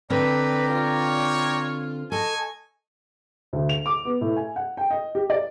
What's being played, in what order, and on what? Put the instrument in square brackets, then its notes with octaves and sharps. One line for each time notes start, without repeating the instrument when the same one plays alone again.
[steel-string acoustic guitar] D3 C4 [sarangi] B4 [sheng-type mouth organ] D5 G5 A#5
[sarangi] F4 [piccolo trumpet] C#5
[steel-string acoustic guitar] A4 [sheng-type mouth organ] D#5 C#6 [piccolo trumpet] G#5
[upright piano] D2
F7
D6
B3
A2
G#5
F#5
G5
D#5
G4
D5